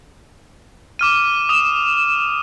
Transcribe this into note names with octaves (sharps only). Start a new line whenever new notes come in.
D6 F6 D#7
D#6 E7